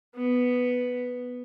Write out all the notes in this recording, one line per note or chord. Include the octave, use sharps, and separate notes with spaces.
B3